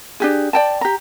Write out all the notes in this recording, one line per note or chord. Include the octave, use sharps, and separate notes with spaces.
D4 G4 G#4
D5 G5 A5
G4 A#5